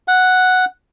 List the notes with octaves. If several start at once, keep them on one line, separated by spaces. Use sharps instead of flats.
F#5